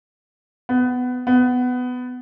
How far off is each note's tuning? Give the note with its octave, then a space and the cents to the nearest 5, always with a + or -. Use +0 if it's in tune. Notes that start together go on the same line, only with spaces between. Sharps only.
B3 +15
B3 +15